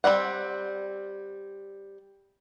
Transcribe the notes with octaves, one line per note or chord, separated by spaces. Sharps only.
G3 C4 D5 F#5